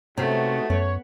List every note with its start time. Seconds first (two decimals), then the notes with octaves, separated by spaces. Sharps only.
0.17 G#2 C3 A3 B3 C#4 F#4
0.70 F#2 B3 C#5